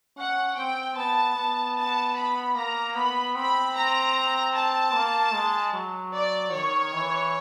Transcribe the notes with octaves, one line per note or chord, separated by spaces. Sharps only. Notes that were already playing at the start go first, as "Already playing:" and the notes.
C#4 F#5
C4 G5
B3 A5
B3
A5
B5
A#3 A#5
B3 B5
C4 B5
A#5
A5
A#3
G#3
F#3
D5
D#3 C#5
E3